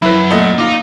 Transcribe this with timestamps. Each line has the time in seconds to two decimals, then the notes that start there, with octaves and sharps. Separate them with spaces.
0.02 F#2 E4 B4 B5 E6
0.30 A#2 A3 D#5 F#5
0.58 D#4 F4 D6